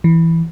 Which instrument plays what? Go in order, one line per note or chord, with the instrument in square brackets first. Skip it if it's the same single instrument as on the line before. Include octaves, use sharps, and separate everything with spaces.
[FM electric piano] E3